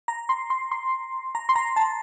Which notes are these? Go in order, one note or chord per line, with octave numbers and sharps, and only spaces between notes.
A#5
C6
C6
C6
A#5
C6
A#5
A5